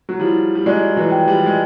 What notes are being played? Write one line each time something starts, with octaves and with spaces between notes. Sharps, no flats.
F#3
F3 G3 E4
G3
F#3 G#3 D5
E3 F#3
G5
F3 G3
G#3